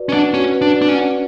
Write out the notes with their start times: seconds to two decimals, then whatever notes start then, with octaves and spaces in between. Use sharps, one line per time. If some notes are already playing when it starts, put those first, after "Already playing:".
Already playing: F#4 B4 D5
0.09 C#4
0.13 D4 F#5
0.34 C#4 F#4
0.54 B4
0.62 D4
0.75 D5
0.82 D4
0.88 C#4
0.95 F#5